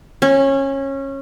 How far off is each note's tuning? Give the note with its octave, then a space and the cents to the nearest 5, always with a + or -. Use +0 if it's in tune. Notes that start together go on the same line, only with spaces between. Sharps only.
C#4 -20